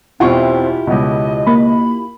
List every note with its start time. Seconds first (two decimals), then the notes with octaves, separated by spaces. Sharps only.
0.20 E2 B2 C4 E4 F4 G4 C#6
0.87 C#2 B2 D#5
1.47 A#3 B5